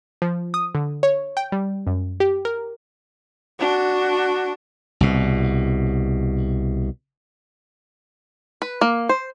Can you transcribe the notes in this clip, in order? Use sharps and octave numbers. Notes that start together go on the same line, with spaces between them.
F3
D#6
D3
C#5
G5
G3
F#2
G4
A#4
D4 F#4
C2 B2
B4
A#3
C5